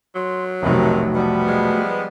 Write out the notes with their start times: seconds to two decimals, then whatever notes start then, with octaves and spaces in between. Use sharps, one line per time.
0.15 F#3 C6
0.63 F1 B1 C3 D#3 A3 F#4
1.16 F3 G3 B3
1.48 G#3